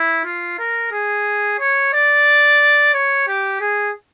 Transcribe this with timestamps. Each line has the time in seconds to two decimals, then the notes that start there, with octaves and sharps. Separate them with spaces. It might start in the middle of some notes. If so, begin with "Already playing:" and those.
Already playing: E4
0.25 F4
0.59 A#4
0.92 G#4
1.60 C#5
1.94 D5
2.94 C#5
3.28 G4
3.61 G#4